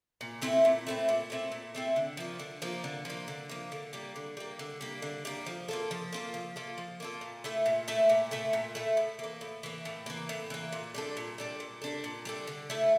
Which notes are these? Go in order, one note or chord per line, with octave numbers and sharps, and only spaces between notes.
A#2
A3 C4 E4
A#2
A3 C4 E4
A#2
A3 C4 E4
A#2
A3 C4 E4
D3
F3 A#3
D3
F3 A#3
D3
F3 A#3
D3
F3 A#3
D3
G3 A#3
D3
G3 A#3
D3
G3 A#3
D3
G3 A#3
F3
A#3 F4 A4
F3
A#3 F4 A4
F3
A#3 F4 A4
F3
A#3 F4 A4
A#2
A3 E4 A4
A#2
A3 E4 A4
A#2
A3 E4 A4
A#2
A3 E4 A4
A2
E3 A#3
A2
E3 A#3
A2
E3 A#3
A2
E3 A#3
A#2
G3 D4 A4
A#2
G3 D4 A4
A#2
G3 D4 A4
A#2
G3 D4 A4
D3
A3 E4 A4